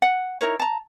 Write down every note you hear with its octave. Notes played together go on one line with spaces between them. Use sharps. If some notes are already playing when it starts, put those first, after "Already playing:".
F#5
D#4 E4 A#4 C#5
A5 A#5